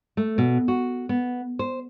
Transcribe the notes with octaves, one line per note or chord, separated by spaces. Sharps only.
A3
B2
F#4
B3
C5